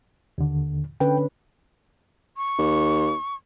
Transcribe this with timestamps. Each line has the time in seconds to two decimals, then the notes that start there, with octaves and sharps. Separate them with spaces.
0.38 D#2 D3
1.00 D3 C#4 B4 G5
2.37 C#6
2.59 D#2